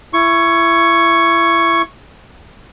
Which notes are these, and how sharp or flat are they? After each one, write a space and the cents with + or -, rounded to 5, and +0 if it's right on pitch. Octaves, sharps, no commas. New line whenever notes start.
E4 +25 C#6 +0